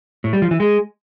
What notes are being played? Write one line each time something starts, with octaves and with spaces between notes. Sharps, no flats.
A2
G3
F3
E3
G#3